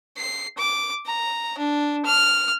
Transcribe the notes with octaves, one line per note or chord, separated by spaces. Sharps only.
C7
D6
A#5
D4
F6